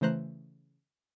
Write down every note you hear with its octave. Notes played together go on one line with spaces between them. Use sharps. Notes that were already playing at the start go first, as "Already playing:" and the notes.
C#3 E3 A3 C5 A#5 F#6